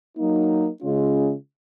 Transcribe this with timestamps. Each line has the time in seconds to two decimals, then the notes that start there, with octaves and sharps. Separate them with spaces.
0.18 F#3 A#3 D#4
0.82 C#3 G#3 C#4 F4